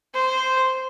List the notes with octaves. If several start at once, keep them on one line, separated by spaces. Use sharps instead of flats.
C5